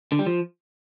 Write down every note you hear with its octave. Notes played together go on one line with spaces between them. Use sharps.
D3
G3
F3